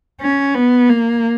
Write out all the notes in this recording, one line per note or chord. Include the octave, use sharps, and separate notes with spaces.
C#4
B3
A#3